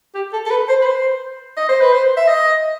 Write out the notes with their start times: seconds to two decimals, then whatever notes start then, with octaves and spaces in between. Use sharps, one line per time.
0.15 G4
0.33 A4
0.46 A4
0.50 B4
0.69 C5
0.82 B4
0.86 C5
1.57 D#5
1.69 C5
1.81 B4
1.93 C5
2.17 E5
2.28 D#5